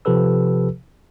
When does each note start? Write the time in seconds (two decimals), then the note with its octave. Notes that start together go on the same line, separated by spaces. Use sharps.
0.05 C3 F3 G4 A4 B4 E6